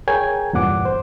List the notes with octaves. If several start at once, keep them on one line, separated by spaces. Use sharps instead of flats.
G#4 A#4 C#5 G5 G#5 G#6
E2 G2 A#2 F#5 D6
C5